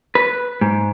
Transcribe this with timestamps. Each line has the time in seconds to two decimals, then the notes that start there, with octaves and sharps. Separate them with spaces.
0.15 B4
0.61 G#2